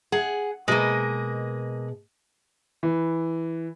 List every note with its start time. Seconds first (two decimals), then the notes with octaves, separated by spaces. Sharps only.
0.12 G#4 F#5
0.68 B2 G#3 A#3 G#4 D#5
2.83 E3